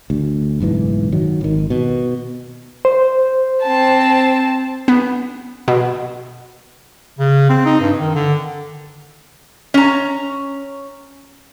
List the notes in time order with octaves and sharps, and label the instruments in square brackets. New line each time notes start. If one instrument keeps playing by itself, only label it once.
[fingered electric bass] D2
F#1 B1 G#2 E3
D#3 F#3
G#1 D#3
B2
[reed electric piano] C5
[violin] C4 A5
[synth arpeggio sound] B3
B2
[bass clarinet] C#3
C4
D#4
G2
D#3
D3
[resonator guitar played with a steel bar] C#4 A#5